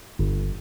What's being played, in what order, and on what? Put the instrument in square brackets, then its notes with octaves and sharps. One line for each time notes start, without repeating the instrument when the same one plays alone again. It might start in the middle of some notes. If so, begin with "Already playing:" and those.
[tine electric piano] G1